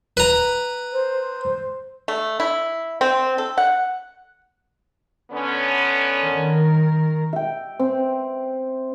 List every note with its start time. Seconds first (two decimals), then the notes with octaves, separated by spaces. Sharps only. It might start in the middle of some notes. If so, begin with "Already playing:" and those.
0.17 B4 A#5
0.93 C5
2.08 A3
2.40 E4
3.01 C4
3.38 A4
3.58 F#5
5.32 D3 B3 C#4
6.22 D#3 A#4
7.33 E5 G5
7.79 C4